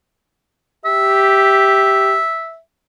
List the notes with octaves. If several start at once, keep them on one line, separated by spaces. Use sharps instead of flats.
G4 E5